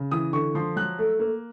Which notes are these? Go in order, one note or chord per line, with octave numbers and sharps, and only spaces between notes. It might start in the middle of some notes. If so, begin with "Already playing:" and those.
Already playing: C#3
E3 D#6
D3 C#6
F3 C6
F#3 F#6
A3
A#3